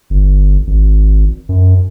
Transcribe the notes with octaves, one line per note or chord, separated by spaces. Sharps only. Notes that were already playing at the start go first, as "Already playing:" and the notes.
G1
G#1
F#2